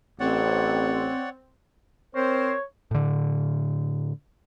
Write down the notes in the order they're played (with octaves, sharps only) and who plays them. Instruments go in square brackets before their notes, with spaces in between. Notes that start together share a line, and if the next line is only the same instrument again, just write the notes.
[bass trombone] A1 [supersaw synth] C4 [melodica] C#5 D5 F#5
[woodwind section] C4 A#4 C5 [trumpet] C#5
[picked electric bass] A2 D3